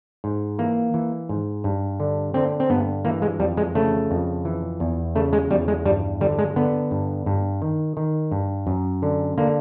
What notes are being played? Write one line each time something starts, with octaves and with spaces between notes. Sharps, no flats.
G#2
E3 A#3
E3
G#2
G2
D3
D3 C4
C4
G2 B3
E3 A#3
G#3
F2 G3
G#3
C#3 A3
F2
E3
E2
C#3 A3
G#3
E2 G3
G#3
G2 G3
D3 G3
G#3
D3 B3
G2
G2
D#3
D#3
G2
F#2
D3
D3 A#3